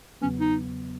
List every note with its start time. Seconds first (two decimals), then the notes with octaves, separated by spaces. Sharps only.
0.22 E2 C#3 F#3 B3 C#4
0.40 D#4